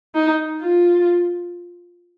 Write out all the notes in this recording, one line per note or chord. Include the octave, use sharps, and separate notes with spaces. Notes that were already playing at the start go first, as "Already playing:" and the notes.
D#4
F4